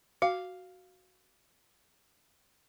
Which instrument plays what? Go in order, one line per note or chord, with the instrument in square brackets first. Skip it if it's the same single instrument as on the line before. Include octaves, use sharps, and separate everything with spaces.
[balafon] F#4 [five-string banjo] F5